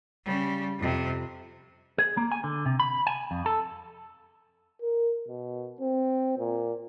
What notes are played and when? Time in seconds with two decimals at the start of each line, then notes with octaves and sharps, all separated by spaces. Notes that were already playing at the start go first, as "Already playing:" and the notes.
0.25 C#3 G3
0.79 F2 C3
1.98 G#4
2.17 A#3
2.32 G#5
2.44 D3
2.66 C3
2.80 B5
3.07 G#5
3.31 F2
3.46 A4
4.82 A#4
5.28 B2
5.81 C4
6.39 A#2